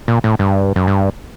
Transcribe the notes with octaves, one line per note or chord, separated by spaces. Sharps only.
A#2
A2
G2
F#2
G2